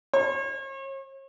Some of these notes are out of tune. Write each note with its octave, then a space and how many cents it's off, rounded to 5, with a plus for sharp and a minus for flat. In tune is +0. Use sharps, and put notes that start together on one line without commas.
C#5 -45